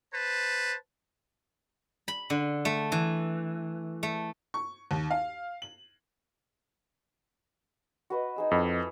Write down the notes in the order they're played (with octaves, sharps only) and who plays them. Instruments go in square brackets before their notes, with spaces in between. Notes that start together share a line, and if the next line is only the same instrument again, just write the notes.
[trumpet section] B4 C5 A5
[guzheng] B5
D3
A3
E3
A3
[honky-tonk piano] C#6
D#2
F5
F#7
[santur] F#4 B4 D#5
D#4 G#4 E6
[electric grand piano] F2 [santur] E4